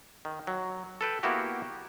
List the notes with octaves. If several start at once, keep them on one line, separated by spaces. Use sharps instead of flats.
D#3
F#3
A4 B4 G5
A#3 B3 E4 F#4 G4